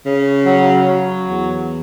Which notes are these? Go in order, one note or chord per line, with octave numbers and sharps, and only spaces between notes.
C#3
F#3
F#3
E2